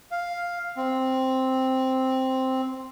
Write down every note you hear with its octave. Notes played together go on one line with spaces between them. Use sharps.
F5
C4